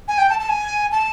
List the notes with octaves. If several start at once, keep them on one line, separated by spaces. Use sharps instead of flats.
G#5
G5
A5
A5
G#5
A5